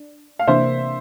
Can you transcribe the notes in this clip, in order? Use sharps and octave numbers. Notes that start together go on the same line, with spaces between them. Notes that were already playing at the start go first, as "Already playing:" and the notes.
Already playing: D4
F5
C3 E3 A#3 D4 C5 E5